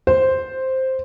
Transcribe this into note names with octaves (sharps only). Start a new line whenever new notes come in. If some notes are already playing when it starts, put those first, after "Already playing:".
C5